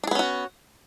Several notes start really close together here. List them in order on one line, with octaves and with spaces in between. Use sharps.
D4 G#4 B3 C#4 F#4